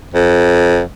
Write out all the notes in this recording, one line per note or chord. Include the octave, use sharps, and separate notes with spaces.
F2